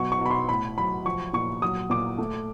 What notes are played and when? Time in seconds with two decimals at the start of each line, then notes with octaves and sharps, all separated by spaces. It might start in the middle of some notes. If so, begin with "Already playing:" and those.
Already playing: B2 F#3 C#6
0.12 C#6
0.21 B2 B5
0.30 C6
0.49 A2 B5
0.77 F#3 B5
1.05 F3 C#6
1.33 A#2 C#6
1.62 F#3 D#6
1.90 A#2 D6
2.18 A3